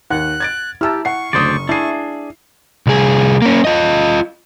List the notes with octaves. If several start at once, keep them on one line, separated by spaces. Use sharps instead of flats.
D#2 F#5 F#6
G#6 A6 D7
E4 G4 A5 A#5 E6 F6
F#5 C#6 C7
F#1 D2 C5 D5 D#6
D4 E4 G#4 E5 C7
C2 G#4
A#3 C#4
F4 D#5